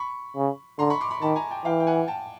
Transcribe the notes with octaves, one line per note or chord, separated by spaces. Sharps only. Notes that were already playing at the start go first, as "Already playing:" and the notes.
Already playing: B5 C#6
C#3
D3 A#5 C6
B5 C#6
C6 D6
B5 C#6
D#3 A5 B5
G#5 A#5
G5 A5
E3 F5 G5
G5
F#5 G#5
G5 A5